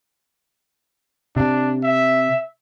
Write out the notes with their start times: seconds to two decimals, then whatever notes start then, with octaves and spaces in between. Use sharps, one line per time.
1.36 C3 D4
1.83 E5